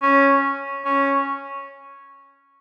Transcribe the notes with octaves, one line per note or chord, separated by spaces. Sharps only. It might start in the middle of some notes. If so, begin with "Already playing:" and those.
C#4
C#4